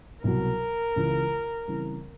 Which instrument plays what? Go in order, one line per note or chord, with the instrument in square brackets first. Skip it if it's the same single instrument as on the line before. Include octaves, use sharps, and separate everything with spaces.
[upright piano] C2 B2 F#3 [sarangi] A#4
[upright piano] C#2 C#3 E3 G#3
C#3 E3 G3 C4 E4